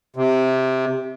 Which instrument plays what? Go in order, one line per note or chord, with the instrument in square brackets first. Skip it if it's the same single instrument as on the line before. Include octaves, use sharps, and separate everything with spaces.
[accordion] C3